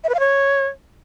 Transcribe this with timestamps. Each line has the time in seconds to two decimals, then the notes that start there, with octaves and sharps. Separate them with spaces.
0.04 E5
0.09 B4
0.14 F5
0.20 C#5